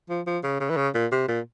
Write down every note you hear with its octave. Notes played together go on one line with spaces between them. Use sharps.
F3
F3
C#3
C#3
E3
C#3
A#2
C3
A#2